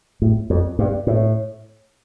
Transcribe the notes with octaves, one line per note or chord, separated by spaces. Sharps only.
A2
F2
G2
A2